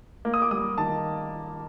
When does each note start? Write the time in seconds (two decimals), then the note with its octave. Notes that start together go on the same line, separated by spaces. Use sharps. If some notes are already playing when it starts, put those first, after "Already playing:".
0.25 A#3
0.34 D#6
0.42 D6
0.51 G3 D#6
0.78 D#3 A5